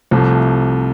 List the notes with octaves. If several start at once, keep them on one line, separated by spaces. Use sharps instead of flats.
C2 C3 F3 A3